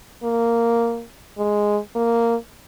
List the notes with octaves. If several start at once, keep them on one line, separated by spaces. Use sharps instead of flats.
A#3
G#3
A#3